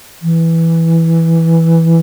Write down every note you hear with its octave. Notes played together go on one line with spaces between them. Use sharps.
E3